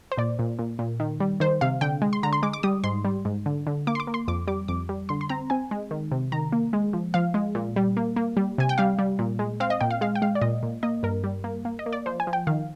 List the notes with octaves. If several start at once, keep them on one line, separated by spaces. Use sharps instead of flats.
C5
A#2 D5
A#2
A#2
A#2
D#3
G3
D#3 C5
C3 F5
D3 G5
G#3
C6
D3 A#5
C6
G#3 D6
D6
G3 D#6
G#2 C6
G3
G#2
D3
D3
A#3 D6
C6
D6
A#3
C6
F2 D6
G3 D6
F2 D6
G3
D3 C6
C6
C4 A#5
C4 G#5
G#3
D#3
C3
D#3 A#5
A#3
G#3
F3
F3 F5
G#3
A#2
G3
A#3
A#3
G3
C3 G#5
G5
G3 F5
G3
A#2
G#3
C4 F5
D#5
A#2 G5
F5
G#3 F5
G5
G#3 F5
D5
A#2 D#5
A#2
A#3 D#5
G2 A#4
G3
A#3
A#3
D#5
A#3
D5
F3 C5
G#5
F3
G5
D#3 F5